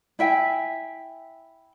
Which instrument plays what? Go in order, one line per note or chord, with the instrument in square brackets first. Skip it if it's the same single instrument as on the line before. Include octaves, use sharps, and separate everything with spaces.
[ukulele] E4 E5 G5 G#5